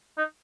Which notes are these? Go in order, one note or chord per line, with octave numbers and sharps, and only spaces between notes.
D#4